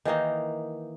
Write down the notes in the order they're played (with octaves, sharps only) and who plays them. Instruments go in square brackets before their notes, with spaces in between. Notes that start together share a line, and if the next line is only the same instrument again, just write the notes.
[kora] D#3 E3 A#3 D#4